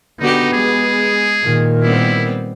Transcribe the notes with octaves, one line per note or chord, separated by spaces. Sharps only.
D3 B3 D#4 F#4 G4
G#3 G#4
A#2 D#3
G3 B3 C4 E4